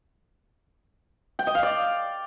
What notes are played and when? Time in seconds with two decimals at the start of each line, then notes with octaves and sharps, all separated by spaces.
1.39 G5
1.47 D#5
1.55 F5
1.63 D5